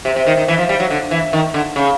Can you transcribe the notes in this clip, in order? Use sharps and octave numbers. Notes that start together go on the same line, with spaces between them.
C3
C3
D#3
D#3
E3
F3
G3
F#3
D3
E3
D#3
D3
C#3